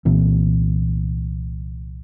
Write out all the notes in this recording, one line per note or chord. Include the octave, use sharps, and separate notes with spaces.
C2 A#2 E3 C4